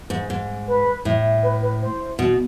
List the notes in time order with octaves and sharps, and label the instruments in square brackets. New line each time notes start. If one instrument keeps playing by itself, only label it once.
[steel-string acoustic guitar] G#2
G#2
[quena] B4
[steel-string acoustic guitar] A2
[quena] B4
B4
C5
[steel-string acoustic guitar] B2